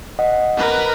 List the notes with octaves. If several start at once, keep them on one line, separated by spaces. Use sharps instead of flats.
D#5 F#5
A#4 B4